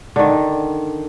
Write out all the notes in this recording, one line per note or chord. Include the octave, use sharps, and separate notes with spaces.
D3 D#3